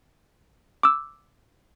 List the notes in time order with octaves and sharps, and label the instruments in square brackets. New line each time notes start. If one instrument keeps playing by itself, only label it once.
[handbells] D6 E6